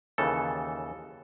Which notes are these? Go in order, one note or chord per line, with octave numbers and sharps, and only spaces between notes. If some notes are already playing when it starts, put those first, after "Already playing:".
D#2 C#3 E3 A4